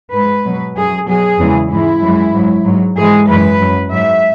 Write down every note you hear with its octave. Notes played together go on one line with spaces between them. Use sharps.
G#2 G#3 B4
B2 F#3
F#2 F#3 G#4
B2 F#3 G#4
E2 C#3 E3 G#3
G#2 E3 G#3 E4
F#2 E3 G#3
G#2 F#3
G#2 F#3
G#2 E3 G#3 G#4
F#2 E3 G#3 B4
F#2 F#3
G#2 F#3 E5